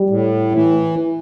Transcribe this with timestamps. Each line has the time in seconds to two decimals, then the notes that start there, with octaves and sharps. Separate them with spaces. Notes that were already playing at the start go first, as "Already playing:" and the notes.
Already playing: G3
0.10 A2
0.52 E3